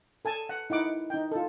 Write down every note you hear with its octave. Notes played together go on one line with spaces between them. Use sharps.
A4 G#5 A5
F#5
D#4 E4 F#5 D6
D#4 G5
F4 A4